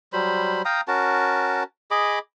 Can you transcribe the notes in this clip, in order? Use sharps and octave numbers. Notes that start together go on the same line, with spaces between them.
F#3 G3 C5 B5
F5 G5 A#5 D#6
C#4 F#4 A#4 A5
G#4 D#5 B5 D6